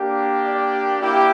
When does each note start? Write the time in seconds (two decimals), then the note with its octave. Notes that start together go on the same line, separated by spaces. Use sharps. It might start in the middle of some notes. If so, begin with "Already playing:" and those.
Already playing: A#3 D4 G4
0.44 D5
1.00 A#3 E4 G4